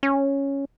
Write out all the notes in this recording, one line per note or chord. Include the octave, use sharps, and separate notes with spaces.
C#4